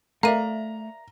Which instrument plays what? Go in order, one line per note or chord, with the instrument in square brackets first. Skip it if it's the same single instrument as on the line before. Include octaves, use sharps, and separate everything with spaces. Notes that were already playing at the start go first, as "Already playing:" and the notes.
[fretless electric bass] A3 [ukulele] A#4 D5 E5 [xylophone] F5 D#7 [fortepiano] A#5